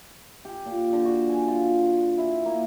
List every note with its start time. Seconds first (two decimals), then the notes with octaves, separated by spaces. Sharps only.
0.45 G4
0.66 A#2
0.93 D3
1.05 F#4
1.29 G#5
1.48 F4
2.18 E4
2.45 A#3